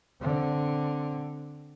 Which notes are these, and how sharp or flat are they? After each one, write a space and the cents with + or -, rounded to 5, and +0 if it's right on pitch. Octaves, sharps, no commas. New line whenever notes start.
D3 +0 C4 +0